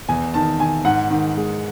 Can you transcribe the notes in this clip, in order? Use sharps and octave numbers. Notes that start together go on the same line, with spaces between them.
E2 G#5
D#3 A5
D#3 G#5
G#2 F#5
D#3
G#3